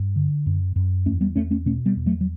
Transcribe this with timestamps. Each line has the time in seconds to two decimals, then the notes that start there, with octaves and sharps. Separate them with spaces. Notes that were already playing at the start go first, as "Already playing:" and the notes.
Already playing: G2
0.16 D3
0.46 F#2
0.76 F#2
1.06 E2 A3 C#4
1.21 G3 B3
1.36 E2 A3 C#4
1.51 A3 C#4
1.66 B2 A3 C#4
1.86 G3 B3
1.96 E2
2.06 F#3 A3
2.21 F#3